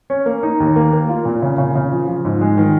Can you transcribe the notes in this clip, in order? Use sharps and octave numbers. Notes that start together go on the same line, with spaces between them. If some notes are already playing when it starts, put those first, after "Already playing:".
C#4
A#3
D#4
D#2
A#3
A#3
F4
A#2
C#3
C#3
C#3
F3
F3
G#2
G#3
D#3